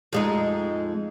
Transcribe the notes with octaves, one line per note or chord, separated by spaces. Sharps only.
F2 G#3 D#4